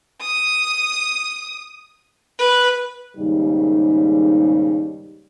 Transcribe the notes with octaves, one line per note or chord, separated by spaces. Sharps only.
D#6
B4
D#2 G#2 C#3 G3 D#4 G4